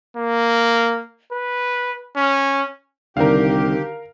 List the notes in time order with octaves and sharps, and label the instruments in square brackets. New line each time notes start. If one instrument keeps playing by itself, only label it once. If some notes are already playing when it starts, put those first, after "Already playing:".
[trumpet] A#3
B4
C#4
[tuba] C2 [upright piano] D3 D#3 [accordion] G4 [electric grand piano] A#4 F5